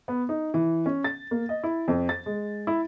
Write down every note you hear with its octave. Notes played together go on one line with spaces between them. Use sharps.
B3
D#4
E3
C#4
A6
A#3
D#5
E4
F2
A6
G#3
E4